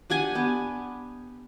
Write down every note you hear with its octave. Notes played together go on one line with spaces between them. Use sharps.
D4 G4 F#5 G#5
B3 G4